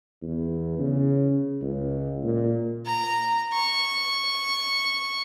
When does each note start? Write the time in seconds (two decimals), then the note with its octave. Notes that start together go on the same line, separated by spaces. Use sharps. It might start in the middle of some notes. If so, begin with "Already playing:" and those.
0.23 E2
0.79 C#3
1.62 C#2
2.23 A#2
2.86 A#5
3.53 C#6